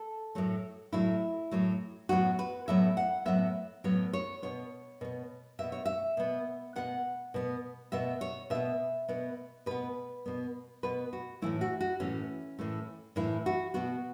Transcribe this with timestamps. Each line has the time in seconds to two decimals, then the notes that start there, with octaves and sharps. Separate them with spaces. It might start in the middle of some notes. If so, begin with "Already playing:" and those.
Already playing: A4
0.35 A2 F#3 A3
0.93 A2 F#3 A3 E4
1.51 A2 F#3 A3
2.09 A2 F#3 B3 F#4
2.39 B4
2.68 A2 F#3 B3 E5
2.97 F#5
3.26 A2 F#3 B3 E5
3.84 A2 F#3 B3 C#5
4.13 C#5
4.42 B2 B3 C#5
5.01 B2 B3
5.59 B2 B3 E5
5.72 C#5
5.86 E5
6.17 B2 B3
6.76 B2 B3 F#5
7.34 B2 B3
7.92 B2 B3 E5
8.21 C#5
8.50 B2 B3 E5
9.09 B2 B3
9.66 B2 B3 B4
10.26 B2 B3
10.83 B2 B3 B4
11.13 F#4
11.42 A2 E3 A3 E4
11.61 F#4
11.81 F#4
12.00 A2 E3 A3 C#4
12.59 A2 E3 A3
13.16 A2 E3 A3 E4
13.46 F#4
13.74 B2 B3 F#4